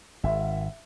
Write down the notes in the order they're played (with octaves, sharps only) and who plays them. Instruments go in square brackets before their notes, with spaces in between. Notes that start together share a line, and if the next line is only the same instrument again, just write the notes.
[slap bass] G#1 [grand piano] E5